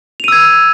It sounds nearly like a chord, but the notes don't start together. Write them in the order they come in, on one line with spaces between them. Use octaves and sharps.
F7 D#7 E6 G#6